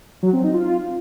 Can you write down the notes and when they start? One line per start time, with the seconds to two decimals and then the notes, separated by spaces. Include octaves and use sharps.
0.23 F#3
0.33 C4
0.43 D#4
0.54 F4